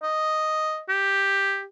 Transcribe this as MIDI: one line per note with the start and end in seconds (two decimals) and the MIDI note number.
0.03 0.81 75
0.89 1.64 67